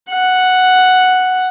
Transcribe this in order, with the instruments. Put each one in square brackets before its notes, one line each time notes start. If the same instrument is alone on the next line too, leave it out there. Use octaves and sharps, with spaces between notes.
[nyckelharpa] F#5